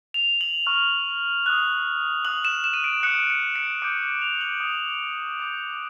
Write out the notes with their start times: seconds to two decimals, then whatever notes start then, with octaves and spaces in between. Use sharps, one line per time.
0.14 F7
0.41 F#7
0.67 C#6 F6
1.46 D#6 F#6
2.25 D#6 F#6 F#7
2.45 E7
2.64 E7
2.74 D#7
2.84 D7
3.03 D#6 F#6 C#7
3.30 C#7
3.56 C#7
3.82 D6 G6 D7
4.22 F7
4.41 F#7
4.60 D#6 G6
5.39 D6 G6